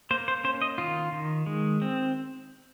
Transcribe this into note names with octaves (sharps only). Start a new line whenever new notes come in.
A#3 C5
C5
C#4 C5
D#5
D#3 F4
D#3
G#3
C4